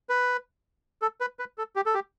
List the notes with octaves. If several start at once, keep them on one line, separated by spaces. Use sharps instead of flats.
B4
A4
B4
B4
A4
G4
A4
G4